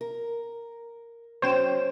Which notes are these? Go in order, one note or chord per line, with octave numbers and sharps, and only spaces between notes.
A#4
F#3 C#4 C5 G5 E7